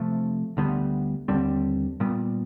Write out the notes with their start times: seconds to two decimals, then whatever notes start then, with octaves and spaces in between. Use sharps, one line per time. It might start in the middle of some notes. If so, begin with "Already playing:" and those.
Already playing: C3 F3 A3
0.57 D2 D3 G3 B3
1.28 D#2 D3 G3 C4
2.00 A#2 G3 B3